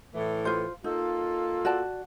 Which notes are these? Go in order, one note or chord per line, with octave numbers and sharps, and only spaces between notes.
A2 E3
F4 C5
A#3 D#4 F4 A4
F#4 D5 A5